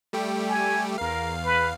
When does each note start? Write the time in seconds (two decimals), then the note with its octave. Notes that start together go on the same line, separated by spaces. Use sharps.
0.13 G3 A3 G4
0.48 G#5
0.98 E2 A#4 F5
1.45 B4